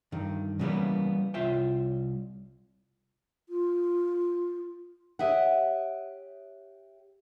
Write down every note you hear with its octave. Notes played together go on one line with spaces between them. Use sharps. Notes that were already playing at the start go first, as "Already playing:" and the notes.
G2 D#3
C#3 E3 G3 G#3 A#3 B3
C2 F4 C#5 E5 G5
F4
G4 C#5 D#5 E5 F#5